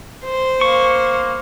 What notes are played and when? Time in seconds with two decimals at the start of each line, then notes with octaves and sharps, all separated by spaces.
0.24 C5
0.61 A#3 C#6